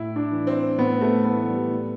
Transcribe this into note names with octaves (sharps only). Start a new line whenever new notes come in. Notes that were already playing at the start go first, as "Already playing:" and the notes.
Already playing: A2 E4
D4
E3
C4
A2 B3
A3
E3 B3
G3
A2